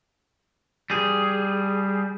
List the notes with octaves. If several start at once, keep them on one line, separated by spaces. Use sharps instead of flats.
G3 G#4